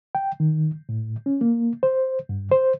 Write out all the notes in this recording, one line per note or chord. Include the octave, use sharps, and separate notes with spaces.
G5
D#3
A2
C#4
A#3
C5
G2
C5